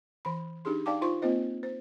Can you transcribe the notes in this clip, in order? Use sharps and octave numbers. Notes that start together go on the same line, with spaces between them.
E3 B5
D4 D#4 G4 G#4 C6
D#4 D5 F5 G5 A5 D6
D#4 F4 C5 C6 C#6
A#3 C4 F4 C5 D#5
C5